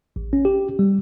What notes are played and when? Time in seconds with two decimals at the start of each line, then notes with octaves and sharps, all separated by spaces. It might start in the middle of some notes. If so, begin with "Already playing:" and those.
0.16 A1
0.33 C#4
0.45 G4
0.79 G3